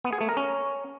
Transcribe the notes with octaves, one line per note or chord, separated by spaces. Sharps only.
B3
G#4
A3
A#4
C#4